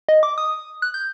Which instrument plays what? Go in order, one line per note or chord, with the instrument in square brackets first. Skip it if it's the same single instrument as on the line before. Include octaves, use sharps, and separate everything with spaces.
[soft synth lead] D#5
D6
D#6
F#6
G6